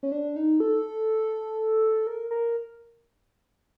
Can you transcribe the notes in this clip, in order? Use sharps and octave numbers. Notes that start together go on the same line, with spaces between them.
C#4
D4
D#4
A4
A#4
A#4